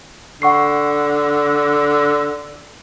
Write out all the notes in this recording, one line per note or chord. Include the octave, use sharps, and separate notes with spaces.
D3 F#5 C#6 C7